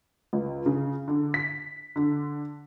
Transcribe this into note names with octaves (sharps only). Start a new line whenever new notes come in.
C#2
C#3
D3
B6
D3